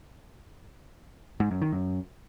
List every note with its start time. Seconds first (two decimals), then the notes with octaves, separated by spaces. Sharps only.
1.40 G#2
1.51 F#2
1.62 D#3
1.72 F#2